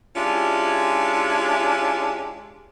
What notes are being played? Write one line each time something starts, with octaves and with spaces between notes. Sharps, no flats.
G#3 C#4 D4 E4 F4 G4